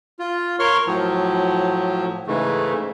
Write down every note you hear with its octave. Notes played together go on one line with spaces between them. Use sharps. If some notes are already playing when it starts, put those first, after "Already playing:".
F4
A#4 C#5 C6 C#6 F6
A2 F3 F#3
G#2 C#3 E3 A3